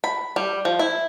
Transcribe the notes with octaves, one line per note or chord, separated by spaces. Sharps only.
B5
G3
F3
E4